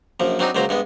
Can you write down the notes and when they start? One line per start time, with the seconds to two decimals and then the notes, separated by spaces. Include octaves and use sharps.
0.20 A#1 F#2 F3
0.39 F#3 C4 D4 D#4
0.55 C#2 A#2 F#3 C5 A#5
0.69 G2 G#3 B3